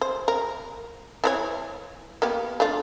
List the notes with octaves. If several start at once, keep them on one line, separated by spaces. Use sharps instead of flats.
C5
A#4
E3 D#4 C#5
A#3 B3 G4
A3 D4 F4